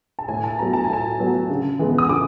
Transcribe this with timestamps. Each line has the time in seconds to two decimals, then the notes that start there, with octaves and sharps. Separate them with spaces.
0.19 A5
0.28 A2 G#5
0.44 A5
0.59 F#3 B3 A#5
0.73 A5
0.84 G#5
0.89 A2 A5
1.19 F#3 B3
1.50 C#3
1.79 E3 G#3 B3
1.98 D#6
2.09 C#3 D6